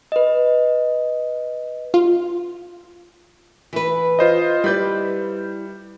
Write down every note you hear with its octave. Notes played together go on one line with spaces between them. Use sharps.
B4 D#5
F4
E3 B4
F4 C5 D#5
G3 E4 B4 D5 G6